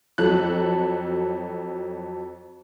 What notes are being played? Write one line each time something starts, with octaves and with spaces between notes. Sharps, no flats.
F2 F#3 A4 F#6